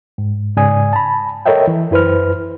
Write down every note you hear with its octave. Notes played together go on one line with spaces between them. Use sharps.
G#2
G#2 C#3 D5 G#5 D#6
A5 B5
A4 A#4 C#5 D#5 E5 G5
E3
F#2 E4 B4 C5 F6